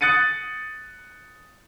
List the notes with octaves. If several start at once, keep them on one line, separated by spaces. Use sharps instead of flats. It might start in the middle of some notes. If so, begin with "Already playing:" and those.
D#6 F#6 A6 C#7 D#7